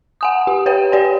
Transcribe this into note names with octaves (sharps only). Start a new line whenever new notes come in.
F#5 G#5 D#6
G4
B4 C#5 G5
G4 D5 G#5